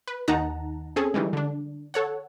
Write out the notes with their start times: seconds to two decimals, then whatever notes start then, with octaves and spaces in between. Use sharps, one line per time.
0.08 B4
0.28 D#2 D#3 D#4 F#5 A5 A#5
0.96 C4 C#4 G#4 A4
1.14 D#3 E3 G3 G#3
1.33 D3 D4
1.94 A4 C#5 F#5